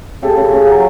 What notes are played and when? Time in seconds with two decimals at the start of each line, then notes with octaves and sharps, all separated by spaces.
0.22 C#3 G4 A4
0.37 C#3
0.52 C#3
0.67 F#3